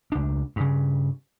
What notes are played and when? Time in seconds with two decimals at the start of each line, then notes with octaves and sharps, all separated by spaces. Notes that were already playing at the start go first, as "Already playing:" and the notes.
0.12 C#2 D4
0.56 G2 C#3